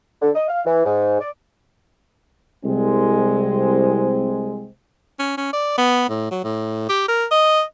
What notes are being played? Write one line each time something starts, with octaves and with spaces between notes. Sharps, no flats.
D3
D#5
F5
E3
G#2
D5
C2 G#3 C4
C#4
C#4
D5
B3
A2
F#3
A2
G4
A#4
D#5